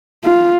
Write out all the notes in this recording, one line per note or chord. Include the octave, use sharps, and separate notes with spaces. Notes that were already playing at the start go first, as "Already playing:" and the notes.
F4